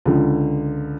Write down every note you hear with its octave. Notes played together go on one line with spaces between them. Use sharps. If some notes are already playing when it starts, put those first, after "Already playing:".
C#2 D3